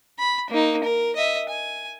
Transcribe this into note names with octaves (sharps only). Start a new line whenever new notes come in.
B5
A#3 D#4
A#4
D#5 E5
G#5